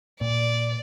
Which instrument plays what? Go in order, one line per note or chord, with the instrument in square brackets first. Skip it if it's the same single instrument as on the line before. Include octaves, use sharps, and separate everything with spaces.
[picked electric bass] A#2 [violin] D5